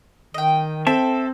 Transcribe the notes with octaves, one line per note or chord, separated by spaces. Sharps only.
D#3 D#5 G5
C4 A4 E5 G5 A5